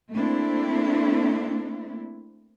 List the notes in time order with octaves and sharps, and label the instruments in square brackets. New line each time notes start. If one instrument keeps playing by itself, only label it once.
[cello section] A3 A#3 C4 D4 E4